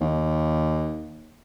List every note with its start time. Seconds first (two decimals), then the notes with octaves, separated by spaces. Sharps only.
0.01 D#2